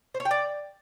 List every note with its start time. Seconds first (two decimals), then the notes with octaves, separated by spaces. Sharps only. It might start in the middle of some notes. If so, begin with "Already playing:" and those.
0.14 C5
0.20 C#5
0.25 G5
0.31 D5